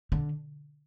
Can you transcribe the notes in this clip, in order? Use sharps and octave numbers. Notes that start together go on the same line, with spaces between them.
D3